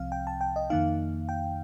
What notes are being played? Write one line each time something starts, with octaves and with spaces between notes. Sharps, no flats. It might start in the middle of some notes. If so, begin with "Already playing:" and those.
Already playing: C2 C3 F3 C4 F5
G5
A5
G5
D#5
F2 D#3 A#3 D#4 F5
G5